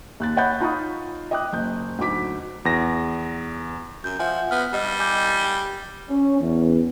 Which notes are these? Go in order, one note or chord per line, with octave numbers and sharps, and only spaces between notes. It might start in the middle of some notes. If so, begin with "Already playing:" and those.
D#2 F#6 A6
C#5 D#5 F#5 B5 G6 A6
D#4 F4 A#5 B5 C#6 D#6
D#5 G5 D6 D#6 F#6
F#1 G6
D2 F#3 D#4 D6 B6
E2 A#6
F#2 G6
F3 E5 F#5 G#5
B3 F6
G3 D#5 G5
G#5 D6 G6
C#4
E2